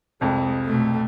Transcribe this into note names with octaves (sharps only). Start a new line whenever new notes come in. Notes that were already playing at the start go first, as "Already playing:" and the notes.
C2 F2 G#3
B2 A3